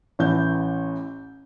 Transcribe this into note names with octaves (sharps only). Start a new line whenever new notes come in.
A1 E3 G6